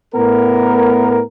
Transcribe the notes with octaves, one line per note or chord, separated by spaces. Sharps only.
A2 B3 A#4